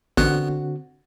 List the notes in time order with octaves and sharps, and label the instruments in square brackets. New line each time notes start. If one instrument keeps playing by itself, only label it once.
[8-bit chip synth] A1 B3 F#6 [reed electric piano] D3 C4 F#4